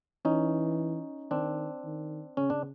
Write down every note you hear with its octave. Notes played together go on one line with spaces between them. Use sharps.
E3 C#4 D#4
D#3 C4 D4
D#3
C#3 C#4
D4